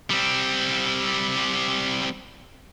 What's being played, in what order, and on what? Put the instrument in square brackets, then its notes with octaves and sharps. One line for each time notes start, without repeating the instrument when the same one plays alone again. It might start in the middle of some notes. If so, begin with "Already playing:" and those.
[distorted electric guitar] G3 C4